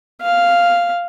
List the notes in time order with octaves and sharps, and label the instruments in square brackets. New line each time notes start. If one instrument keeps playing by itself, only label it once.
[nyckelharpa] F5